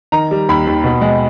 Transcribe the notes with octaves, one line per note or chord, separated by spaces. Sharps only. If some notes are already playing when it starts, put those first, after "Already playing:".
D#3 A#5
G3
D#2 B5
D#2
B2
G#3